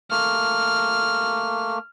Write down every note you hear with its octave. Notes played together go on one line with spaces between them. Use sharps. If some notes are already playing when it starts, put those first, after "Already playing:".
A3 A#3 F6